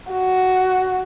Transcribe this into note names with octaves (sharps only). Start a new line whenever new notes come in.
F#4